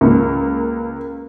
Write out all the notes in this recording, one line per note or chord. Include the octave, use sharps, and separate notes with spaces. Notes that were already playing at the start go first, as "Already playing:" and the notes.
C#2 A#3